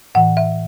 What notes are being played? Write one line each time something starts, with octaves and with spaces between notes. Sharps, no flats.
A2 E3 F#5
E5